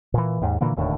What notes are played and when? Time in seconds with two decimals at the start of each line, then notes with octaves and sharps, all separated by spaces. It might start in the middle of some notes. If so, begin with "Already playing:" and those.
0.14 A#2 E3
0.41 D#2 G#2
0.61 A#2 D3 E3 A#3
0.76 E1 D#2 A2 D3